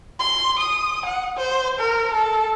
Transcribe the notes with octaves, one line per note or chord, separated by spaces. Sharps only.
C6
D#6
F#5
C5
A#4
A4